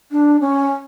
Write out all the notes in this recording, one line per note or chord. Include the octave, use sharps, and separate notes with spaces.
D4
C#4